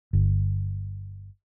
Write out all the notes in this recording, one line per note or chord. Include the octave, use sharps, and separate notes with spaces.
G1